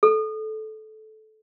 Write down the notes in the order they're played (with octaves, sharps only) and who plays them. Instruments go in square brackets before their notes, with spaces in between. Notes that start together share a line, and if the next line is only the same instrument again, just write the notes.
[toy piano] A4